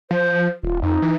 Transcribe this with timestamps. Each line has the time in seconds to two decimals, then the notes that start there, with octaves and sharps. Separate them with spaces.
0.11 F3 C5
0.63 D#1 F4
0.83 F2 D#4
1.02 E3